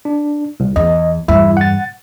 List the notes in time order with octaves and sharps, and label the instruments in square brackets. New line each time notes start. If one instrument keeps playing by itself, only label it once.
[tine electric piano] D4
C2
[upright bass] E2 [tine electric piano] D#5
[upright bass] E2 G2 [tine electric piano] E4 E5
[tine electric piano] F#5 A6